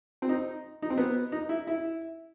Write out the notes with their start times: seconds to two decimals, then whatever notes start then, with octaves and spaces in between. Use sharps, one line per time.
0.22 C4
0.29 D#4
0.82 D#4
0.90 C4
0.98 B3
1.32 D#4
1.49 E4
1.67 E4